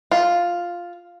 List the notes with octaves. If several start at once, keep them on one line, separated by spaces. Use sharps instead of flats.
F4